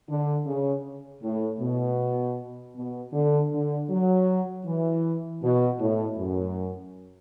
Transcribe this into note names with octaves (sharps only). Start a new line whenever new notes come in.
D3
C#3
A2
B2
B2
D3
D3
F#3
E3
B2
A2
F#2